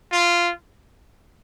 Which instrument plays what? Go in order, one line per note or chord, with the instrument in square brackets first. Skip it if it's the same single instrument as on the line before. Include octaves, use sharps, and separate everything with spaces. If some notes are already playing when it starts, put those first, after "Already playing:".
[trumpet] F4